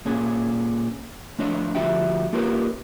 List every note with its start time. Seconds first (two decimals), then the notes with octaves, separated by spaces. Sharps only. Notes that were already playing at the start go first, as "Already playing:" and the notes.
0.06 A#2 C#4 G#4
1.39 F3 A3 D4 C#5 D#5
1.75 D2 F3 F#4 G4 E5 G5
2.33 A#3 F4 G4 A#4 B4 C#5